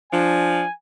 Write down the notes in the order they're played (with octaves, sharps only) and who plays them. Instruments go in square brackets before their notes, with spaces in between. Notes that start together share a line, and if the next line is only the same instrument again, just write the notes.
[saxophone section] F3 D4 [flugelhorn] G#5